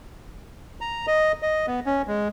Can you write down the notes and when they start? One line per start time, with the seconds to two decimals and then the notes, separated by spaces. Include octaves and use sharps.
0.81 A#5
1.07 D#5
1.42 D#5
1.67 B3
1.86 C#4
2.07 G#3